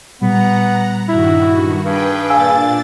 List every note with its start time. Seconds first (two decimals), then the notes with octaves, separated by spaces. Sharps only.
0.22 A#2 G3 B3 F#5 A#5
1.08 G2 D#3 E4 F#4
1.82 G2 G#4 B4 G5
2.30 A#2 D4 F5 G#5 E6 A6